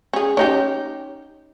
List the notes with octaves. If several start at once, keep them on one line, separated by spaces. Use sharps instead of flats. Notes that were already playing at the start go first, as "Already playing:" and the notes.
C#4 G#4
C#4 D#4 G4